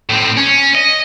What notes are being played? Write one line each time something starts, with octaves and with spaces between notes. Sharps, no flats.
A2 C4
C#4
D#5